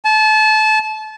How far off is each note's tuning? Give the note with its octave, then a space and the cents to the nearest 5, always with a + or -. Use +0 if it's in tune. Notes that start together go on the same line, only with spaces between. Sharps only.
A5 -30